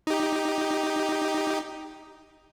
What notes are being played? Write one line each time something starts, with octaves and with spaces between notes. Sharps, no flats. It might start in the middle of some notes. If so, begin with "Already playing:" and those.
D#4 G4